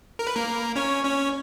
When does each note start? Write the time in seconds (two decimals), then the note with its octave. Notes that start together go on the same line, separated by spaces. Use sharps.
0.19 A#4
0.27 B4
0.35 A#3 A#4
0.76 C#4 C#5
1.04 C#4 C#5